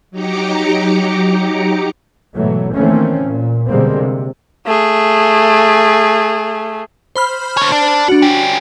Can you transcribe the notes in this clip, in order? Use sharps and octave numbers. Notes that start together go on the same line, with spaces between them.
F#3 D#4 G4 A#5 D6 C#7
G#2 B2 E3 F#3 A3
D#3 E3 A3 A#3 C4 C#4
A#2
B2 D3 G3 G#3 A#3 C4
C3
A3 G#4
C5 B5 F6
D3 C#5
D4
D4 F#4
C#4 G4